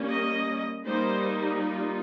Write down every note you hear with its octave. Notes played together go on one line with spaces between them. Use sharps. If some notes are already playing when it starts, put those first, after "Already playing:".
Already playing: G3 A#3 C#4
D#5
G3 A#3 D#4 C5
F4